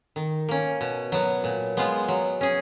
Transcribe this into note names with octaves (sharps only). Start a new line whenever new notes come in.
D#3
A#3 C#4
B2
F#3 B3
A#2
G#3 B3 F4
F#3
C#4 G#4